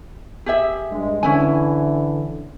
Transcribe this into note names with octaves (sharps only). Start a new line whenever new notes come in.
G4 G#4 E5
G2 G#3
D3 E3 C#4 E4 G#5